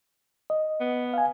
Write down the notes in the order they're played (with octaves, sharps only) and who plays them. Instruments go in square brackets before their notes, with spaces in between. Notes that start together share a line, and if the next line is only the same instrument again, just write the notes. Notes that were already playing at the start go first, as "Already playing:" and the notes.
[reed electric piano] D#5
[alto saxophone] B3
[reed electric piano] F5 G#5